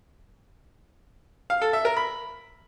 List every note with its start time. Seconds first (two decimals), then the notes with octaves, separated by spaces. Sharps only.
1.50 F5
1.62 A4
1.73 E5
1.85 A#4
1.97 B5